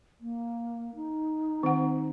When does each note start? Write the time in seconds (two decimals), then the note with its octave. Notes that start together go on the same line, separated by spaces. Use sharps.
0.20 A#3
0.95 D#4
1.63 D#3 C4 F#5